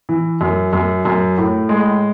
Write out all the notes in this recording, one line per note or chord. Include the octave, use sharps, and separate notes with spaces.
E3
F#2
F#2
F#2
A2
G#3